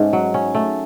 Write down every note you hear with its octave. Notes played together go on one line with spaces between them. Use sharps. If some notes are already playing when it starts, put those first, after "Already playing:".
Already playing: G#2 A3 C#4
F#3
C#4
A3